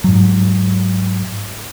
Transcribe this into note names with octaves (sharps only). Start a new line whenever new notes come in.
G#2 F#3